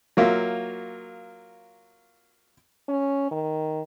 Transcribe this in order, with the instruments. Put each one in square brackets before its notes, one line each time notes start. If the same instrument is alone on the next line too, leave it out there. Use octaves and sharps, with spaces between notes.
[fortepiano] F#3 A#3 F4 E5
[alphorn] C#4
D#3